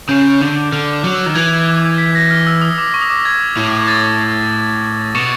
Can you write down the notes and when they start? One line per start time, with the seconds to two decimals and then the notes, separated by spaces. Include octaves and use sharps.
0.09 C#3 G6
0.41 D3
0.72 D3 F6
0.93 D6
1.04 F#3
1.14 E6
1.26 D#3
1.35 E3 G#6
1.98 B6
2.15 A#6
2.30 F6
2.47 E6
2.61 D#6
2.78 D6
2.94 C#6
3.02 D#6
3.09 D6
3.25 G#6
3.57 A2
3.88 A6
5.15 B2 C#6 C#7